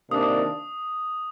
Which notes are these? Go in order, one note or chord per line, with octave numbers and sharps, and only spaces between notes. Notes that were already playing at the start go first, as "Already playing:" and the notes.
C3 D#3 A#3 D4 D#6